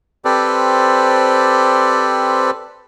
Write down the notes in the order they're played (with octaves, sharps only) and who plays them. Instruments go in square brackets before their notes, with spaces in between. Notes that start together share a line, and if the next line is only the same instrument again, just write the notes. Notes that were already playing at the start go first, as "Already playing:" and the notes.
[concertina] C4 G4 A4 B4 C5 D5